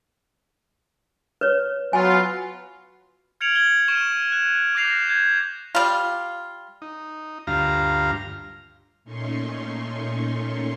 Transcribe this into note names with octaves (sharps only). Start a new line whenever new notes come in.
B4 C#5
F#3 B3 F4 G#5
F6 G#6 C#7 D7 F7 F#7
G#6 G7
C#6 F6 D7 E7 G7
F#6
D6 F6 G6 A#6 C7 F7
G6 G#6 E7
G3 F4
D#4
D2 G2 F4 F5 A#5
A#2 A3 C#4 D#4 C6 C#6